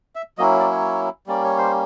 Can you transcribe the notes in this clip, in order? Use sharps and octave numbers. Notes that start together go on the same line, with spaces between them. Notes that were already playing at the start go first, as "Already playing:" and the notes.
E5
F#3 A#3 C#4 E4 D#5
D5
C#5
G3 A#3 C#4 D5
C#5
C5